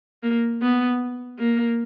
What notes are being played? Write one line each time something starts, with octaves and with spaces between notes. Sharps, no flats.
A#3
B3
A#3